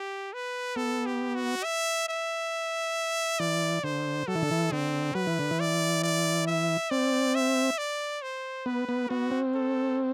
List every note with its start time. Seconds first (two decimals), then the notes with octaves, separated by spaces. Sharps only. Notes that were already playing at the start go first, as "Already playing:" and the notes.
Already playing: G4
0.33 B4
0.76 B3 A4
1.06 G4
1.35 F#4
1.64 E5
2.09 E5
3.39 E3 D5
3.84 D3 C5
4.27 F#3 A4
4.35 E3
4.42 D3
4.51 E3
4.72 D3 C4
5.15 F#3 B4
5.27 E3
5.39 D3
5.51 E3
5.60 D5
6.04 D5
6.47 E5
6.91 C4 D5
7.35 E5
7.78 D5
8.22 C5
8.66 B3 B4
8.89 B3
9.09 B3 F#4
9.31 C4
9.54 A4